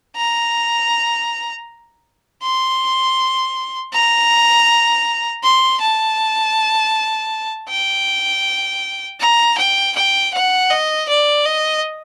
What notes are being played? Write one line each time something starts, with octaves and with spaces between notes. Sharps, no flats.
A#5
C6
A#5
C6
A5
G5
A#5
G5
G5
F#5
D#5
D5
D#5